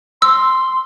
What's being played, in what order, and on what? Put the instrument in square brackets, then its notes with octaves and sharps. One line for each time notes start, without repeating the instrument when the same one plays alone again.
[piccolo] C6 [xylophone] E6